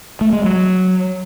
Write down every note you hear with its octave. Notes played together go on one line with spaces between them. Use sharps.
A3
G#3
F#3